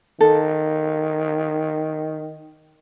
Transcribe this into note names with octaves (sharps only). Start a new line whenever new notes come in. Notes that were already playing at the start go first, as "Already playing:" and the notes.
D#3 A4